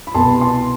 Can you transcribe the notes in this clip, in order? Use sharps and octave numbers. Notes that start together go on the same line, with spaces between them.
B5
C2 B2 B3 A5 C6
A5 C6